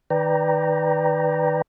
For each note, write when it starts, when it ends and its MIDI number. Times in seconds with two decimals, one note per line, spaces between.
0.10 1.62 51
0.10 1.62 71
0.10 1.62 74
0.10 1.62 79
0.10 1.62 82